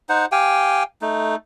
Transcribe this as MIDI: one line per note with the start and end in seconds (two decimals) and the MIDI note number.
0.09 0.26 63
0.09 0.26 72
0.09 0.26 78
0.32 0.83 67
0.32 0.83 77
0.32 0.83 79
0.32 0.83 80
1.02 1.36 57
1.02 1.36 63